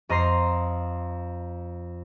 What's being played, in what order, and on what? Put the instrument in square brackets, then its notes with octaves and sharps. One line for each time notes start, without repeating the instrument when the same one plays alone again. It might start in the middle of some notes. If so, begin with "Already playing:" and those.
[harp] F2 D#5 A#5 C6 C7